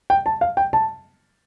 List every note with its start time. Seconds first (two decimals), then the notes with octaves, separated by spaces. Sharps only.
0.10 G5
0.26 A5
0.41 F5
0.57 G5
0.73 A5